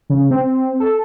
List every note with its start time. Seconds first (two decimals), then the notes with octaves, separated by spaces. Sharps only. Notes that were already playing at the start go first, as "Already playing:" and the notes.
0.10 C#3
0.31 C4
0.80 A4